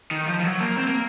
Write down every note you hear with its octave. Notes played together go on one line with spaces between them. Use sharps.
D#3
F3
F3
F#3
A#3
C4
A#3